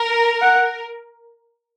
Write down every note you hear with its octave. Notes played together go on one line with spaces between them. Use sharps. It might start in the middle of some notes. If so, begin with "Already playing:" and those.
Already playing: A#4
F#5